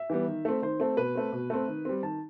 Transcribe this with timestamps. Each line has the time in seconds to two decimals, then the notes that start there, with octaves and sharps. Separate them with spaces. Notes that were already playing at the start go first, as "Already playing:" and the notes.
Already playing: E5
0.10 E3 G3 B3
0.27 D#3
0.45 A3 C4
0.62 D#3 C5
0.80 A3 C4
0.97 B2 B4
1.15 A3 C4
1.32 B2
1.50 A3 C4
1.68 D#3
1.85 G3 C4
2.03 D#3 A5